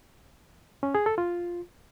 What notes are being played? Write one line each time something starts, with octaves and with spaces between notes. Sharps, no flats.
C#4
G#4
A4
F4